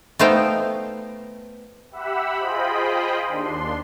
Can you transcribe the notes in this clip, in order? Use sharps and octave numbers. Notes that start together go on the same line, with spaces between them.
A3 B3 D#4 C5 F5 G5
G4 E5 F#5 B5 E6
F4 G#4 C5 D#5 G5 B5
D#2 D4 C6